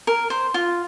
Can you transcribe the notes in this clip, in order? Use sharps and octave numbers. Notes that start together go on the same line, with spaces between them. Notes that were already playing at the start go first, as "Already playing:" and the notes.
A#4
C5
F4